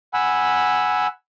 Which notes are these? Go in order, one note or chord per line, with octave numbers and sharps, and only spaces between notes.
F#5 G#5 B5 E6